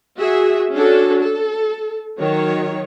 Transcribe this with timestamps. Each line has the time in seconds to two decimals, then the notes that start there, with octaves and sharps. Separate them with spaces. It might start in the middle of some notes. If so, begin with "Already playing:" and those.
0.17 F#4 G#4 E5
0.73 C#4 D4 F#4 A4
1.19 A4
2.20 D#3 F#3 C#5